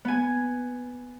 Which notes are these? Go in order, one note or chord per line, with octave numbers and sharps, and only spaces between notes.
B3 G#5